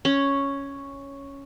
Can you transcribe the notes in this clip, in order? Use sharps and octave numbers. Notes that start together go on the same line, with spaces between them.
C#4